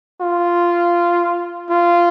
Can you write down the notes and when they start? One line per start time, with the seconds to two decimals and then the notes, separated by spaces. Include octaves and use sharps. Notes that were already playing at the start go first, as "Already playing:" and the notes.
0.21 F4
1.70 F4